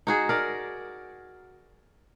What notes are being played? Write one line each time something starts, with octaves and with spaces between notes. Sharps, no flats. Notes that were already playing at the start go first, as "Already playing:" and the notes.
D#4 F#4 G#4
A#4 D5